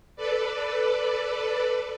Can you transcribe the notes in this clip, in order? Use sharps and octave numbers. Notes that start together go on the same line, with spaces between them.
A4 B4 D5